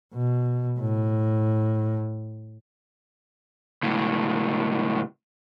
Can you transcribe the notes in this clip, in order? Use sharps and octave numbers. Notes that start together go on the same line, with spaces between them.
B2
A2
C#2 A2